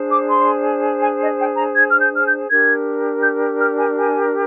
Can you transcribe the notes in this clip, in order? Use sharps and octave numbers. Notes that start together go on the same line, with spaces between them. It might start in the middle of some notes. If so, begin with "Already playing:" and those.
Already playing: D4 G#4 C5
D6
C6
G#5
D#5
G5
A#5
G#6
F6
G6
F6
G6
D4 G4 A#4 G#6
G6
F6
G#5
G#5